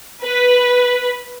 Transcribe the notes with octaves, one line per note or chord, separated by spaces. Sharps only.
B4